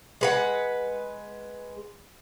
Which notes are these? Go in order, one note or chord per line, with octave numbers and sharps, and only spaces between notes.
G#3 B4 F#5